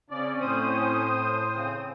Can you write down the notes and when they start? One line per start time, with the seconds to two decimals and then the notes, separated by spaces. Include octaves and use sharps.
0.11 C#3 C4 C#4 D5
0.41 A2 C5 D#6
1.56 C#3 C4